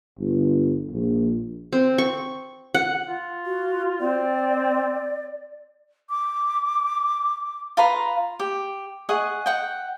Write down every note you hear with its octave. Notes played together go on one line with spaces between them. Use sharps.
G1
A#1
C4
C#6
F#5
F4
F#4
C4 D5
D6
F4 B4 A#5 C6
G4
G#4 D#5 F#5 C#6
F#5 G5